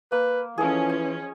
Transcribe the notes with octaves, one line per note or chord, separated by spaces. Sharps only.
A#3 B4
E3 F3 C#4 G#4 A4 D#5
G#5